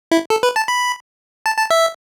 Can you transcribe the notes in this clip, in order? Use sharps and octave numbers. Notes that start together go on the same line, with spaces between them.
E4
A4
B4
A5
B5
A5
A5
E5